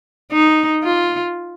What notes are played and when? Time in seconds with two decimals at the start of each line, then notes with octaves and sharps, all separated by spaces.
0.32 D#4
0.84 F4